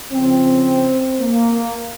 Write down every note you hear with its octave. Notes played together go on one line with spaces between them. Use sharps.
F2 C#3 F3 C4
A#3